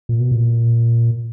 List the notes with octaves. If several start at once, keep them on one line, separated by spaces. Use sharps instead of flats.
A#2
B2
A#2